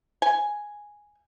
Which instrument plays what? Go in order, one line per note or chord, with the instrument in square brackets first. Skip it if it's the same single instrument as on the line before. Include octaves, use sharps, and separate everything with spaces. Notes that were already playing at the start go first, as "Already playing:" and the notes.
[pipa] G#5